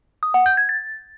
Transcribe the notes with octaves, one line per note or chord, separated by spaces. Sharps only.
D#6
F#5
G6
G#6
A6